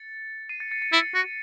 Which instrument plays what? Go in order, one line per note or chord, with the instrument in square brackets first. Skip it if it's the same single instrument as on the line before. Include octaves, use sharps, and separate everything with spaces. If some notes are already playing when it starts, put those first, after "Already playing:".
Already playing: [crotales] A6 C#7
C7 D#7
A6 C#7
A6 C#7
A6 C#7
[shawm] E4 [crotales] A6 C#7
[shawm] F#4